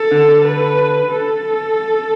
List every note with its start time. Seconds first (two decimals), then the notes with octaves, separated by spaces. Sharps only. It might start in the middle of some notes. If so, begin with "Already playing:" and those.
Already playing: A4
0.11 D3
0.45 B4
1.10 A4